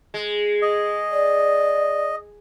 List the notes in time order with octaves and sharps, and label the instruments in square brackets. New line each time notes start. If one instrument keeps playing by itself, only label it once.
[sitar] G#3
[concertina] D#5
[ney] D5